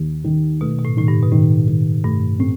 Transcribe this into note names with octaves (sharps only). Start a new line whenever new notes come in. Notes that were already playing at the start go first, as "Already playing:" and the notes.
Already playing: D#2
D#3
B2 A3
B2
A2
A2 D#3
G2
B2
A2 D#3
D#3
G2 A3
A2 C4